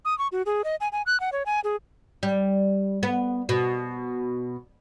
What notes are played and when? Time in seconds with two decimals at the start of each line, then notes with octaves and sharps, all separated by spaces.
0.05 D#6
0.19 C#6
0.32 F#4
0.46 G#4
0.64 D#5
0.81 G#5
0.92 G#5
1.06 F#6
1.20 F#5
1.33 C#5
1.46 G#5
1.64 G#4
2.23 G3
3.03 B3
3.49 B2